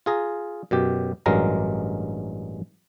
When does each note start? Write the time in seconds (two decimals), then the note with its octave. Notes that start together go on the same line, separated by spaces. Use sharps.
0.06 F4 G#4 A#5
0.71 F#2 B2 G4
1.26 A1 G2 F#3 G#3 A#4 A#5